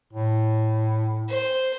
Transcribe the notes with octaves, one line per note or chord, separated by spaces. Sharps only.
A2
C5